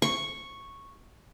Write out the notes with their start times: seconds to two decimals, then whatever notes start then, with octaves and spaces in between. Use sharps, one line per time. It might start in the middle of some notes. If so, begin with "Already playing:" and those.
0.02 C#6